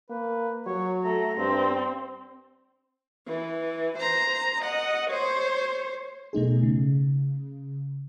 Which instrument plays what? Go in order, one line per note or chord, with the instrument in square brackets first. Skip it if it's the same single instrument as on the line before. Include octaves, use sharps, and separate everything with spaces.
[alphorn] A#3 [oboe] B4
[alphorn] F#3 [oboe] C#5
[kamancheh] A3 [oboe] A#5
[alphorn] G2 [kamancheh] C4
[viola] E3
C5 A#5
D#5 F#5
C5 C#5
[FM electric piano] B2 A3 D#4 G#4
C#3